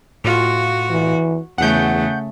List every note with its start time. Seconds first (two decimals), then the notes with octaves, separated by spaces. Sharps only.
0.24 A2 F4 F#4
0.90 E3
1.58 E2 C#3 A3 F#5 G6